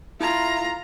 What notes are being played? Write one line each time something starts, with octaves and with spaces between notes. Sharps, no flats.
E4 F4 A#5